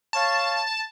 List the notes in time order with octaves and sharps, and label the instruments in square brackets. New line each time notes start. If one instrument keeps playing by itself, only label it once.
[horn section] C#5 F5 [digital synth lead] A5